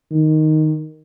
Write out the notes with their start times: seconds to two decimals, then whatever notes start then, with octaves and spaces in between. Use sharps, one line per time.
0.11 D#3